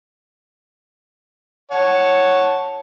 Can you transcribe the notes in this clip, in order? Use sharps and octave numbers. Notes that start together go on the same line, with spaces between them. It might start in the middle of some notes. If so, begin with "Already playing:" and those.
C#5 F#5 A5